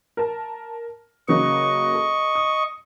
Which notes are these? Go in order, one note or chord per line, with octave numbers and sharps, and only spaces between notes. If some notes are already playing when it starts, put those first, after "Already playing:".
A#4 A5
C#3 F#3 A#3 D#5 C#6
A4
D#6